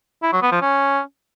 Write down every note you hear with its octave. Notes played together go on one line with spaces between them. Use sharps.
E4
F#3
B3
F3
C#4